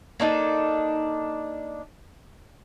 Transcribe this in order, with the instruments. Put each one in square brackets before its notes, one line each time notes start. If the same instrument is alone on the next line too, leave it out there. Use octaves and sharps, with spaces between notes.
[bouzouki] A#3 D4 D#4 A4